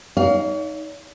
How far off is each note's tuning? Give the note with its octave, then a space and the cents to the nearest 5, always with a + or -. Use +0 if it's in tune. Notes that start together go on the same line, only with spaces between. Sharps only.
D#4 +10 C#5 +40 F5 +0